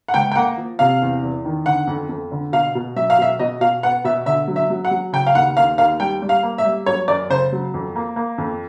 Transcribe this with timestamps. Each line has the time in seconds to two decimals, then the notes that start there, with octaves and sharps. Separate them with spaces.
0.08 F#5
0.14 C#2 G5
0.32 G5
0.35 A#3 F#5
0.57 F3
0.79 C3 F5
1.02 E2
1.22 E2
1.45 D#3
1.66 D3 F#5
1.87 F2
2.09 F2
2.32 D3
2.53 B2 F5
2.75 B2
2.96 F#3 E5
3.10 F5
3.18 B2 E5
3.39 B2 D#5
3.61 B2 F5
3.83 B3 F#5
4.04 B2 E5
4.26 D3 E5
4.48 F#3
4.56 E5
4.70 F#3
4.85 F#5
4.91 F#3
5.13 C#3 G5
5.27 F5
5.35 D#2 F#5
5.57 D#2 F5
5.78 D#2 F5
6.00 G3 G5
6.22 G3
6.29 F5
6.43 A#3
6.58 E5
6.65 G3
6.86 F#3 C#5
7.08 F#2 D5
7.30 C#3 C5
7.52 F#3
7.74 F2
7.96 A#3
8.16 A#3
8.38 F2